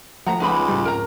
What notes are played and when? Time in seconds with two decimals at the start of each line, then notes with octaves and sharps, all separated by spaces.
0.26 F3 A3 F#5 A#5
0.40 C#2 D#4 B4 B5
0.68 A2 C#3 G3
0.85 F2 G#2 A#4 A#5